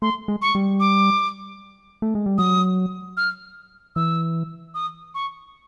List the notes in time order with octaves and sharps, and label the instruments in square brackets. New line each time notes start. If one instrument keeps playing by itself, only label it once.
[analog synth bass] A3 [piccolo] C6
[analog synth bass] G#3
[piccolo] C#6
[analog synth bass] G3
[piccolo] D6
[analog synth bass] A3
G#3
G3
[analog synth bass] F#3 [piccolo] D#6
[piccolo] F6
[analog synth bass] E3 [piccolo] E6
[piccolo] D#6
C#6